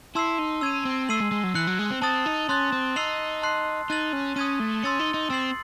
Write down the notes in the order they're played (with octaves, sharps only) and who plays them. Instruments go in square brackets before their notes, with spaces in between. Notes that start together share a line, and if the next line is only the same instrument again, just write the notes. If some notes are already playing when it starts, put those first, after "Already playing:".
[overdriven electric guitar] E4 [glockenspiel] A5 C6 E6 C7
[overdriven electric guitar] D#4
[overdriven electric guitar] C#4 [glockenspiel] E6 G#6 D#7
[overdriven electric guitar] C4
[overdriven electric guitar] A3 [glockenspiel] E6 C7 D#7 F#7
[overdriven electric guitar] G#3
G#3
F#3
[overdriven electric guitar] E3 [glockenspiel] F#6 C#7 F#7
[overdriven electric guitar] F#3
G#3
C4
[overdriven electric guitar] C4 [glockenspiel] A5 D#6 A6
[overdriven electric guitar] D#4
[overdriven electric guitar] C#4 [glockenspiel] C6 F#6 A6
[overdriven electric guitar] C4
[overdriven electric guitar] D#4 [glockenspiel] E6 C7 F#7
[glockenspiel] A5 C6 F#6 C7
[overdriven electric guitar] D#4 [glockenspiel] F#6 A6 D#7 F#7
[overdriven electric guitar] C#4
[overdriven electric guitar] C#4 [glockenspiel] D#6 G#6 D#7
[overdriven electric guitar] A3
[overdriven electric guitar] C#4 [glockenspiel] C6 E6 A6 C#7
[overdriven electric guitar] D#4
D#4
[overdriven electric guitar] C4 [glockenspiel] E6 A6 C7 F#7